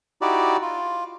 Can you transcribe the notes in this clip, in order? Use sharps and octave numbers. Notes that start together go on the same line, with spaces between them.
D#4 E4 F#4 G4 D5
F4